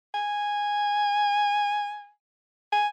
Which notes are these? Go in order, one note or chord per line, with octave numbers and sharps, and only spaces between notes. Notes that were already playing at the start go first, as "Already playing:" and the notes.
G#5
G#5